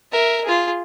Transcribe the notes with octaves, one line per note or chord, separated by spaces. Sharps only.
A#4 E5
F4 G#4